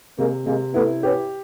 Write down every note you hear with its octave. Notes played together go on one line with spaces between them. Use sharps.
C3 G#3 A#3
C3 G#3 A#3
A3 B3 E4
B3 C#4 G4